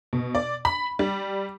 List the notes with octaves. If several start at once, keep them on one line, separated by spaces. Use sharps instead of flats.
B2
D5
B5
G3